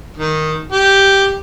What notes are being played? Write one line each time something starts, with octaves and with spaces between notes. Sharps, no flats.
D#3
G4